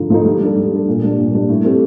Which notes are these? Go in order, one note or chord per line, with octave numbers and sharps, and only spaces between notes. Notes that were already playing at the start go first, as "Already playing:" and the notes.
Already playing: D3 F3 A3 D#4
F3 A3 D#4
G3
D4 A4
G3
D4 A4
A#2
G3 D4
A#2
G3 D4
A2
A3 C4 G4